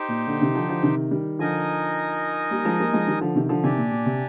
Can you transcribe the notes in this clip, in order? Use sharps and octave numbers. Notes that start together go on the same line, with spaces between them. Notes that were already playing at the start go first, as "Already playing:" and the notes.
Already playing: D#4 G4 C5 G5
A#2
A#2 D3
C3 D#3
D3 F3
D3 F3
C3 D#3
D#3 G3
D3 F3 D#4 A#4 D#5 G#5
G3 A#3
F3 G#3
G3 A#3
F3 G#3
D#3 G3
D3 F3
C3 D#3
D3 F3
C3 D#3 D4 G4 D5 G#5
A#2
A#2
C3